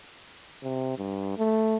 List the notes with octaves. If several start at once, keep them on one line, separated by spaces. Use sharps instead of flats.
C3
G2
A3